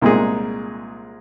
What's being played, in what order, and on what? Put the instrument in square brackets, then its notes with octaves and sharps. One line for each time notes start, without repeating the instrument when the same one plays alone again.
[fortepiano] C2 A#2 G#3 D#4 G#4